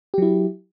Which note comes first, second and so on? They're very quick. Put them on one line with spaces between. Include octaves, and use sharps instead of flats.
G4 F#3 E4